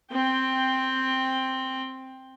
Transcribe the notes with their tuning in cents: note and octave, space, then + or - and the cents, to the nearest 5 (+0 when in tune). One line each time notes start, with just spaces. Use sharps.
C4 +5 G5 +10